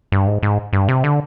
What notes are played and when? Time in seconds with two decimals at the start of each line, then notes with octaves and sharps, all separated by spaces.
0.12 G2
0.27 G#2
0.43 G#2
0.73 G2
0.88 C3
1.04 D3